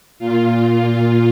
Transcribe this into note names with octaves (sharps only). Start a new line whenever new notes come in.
A#2 F4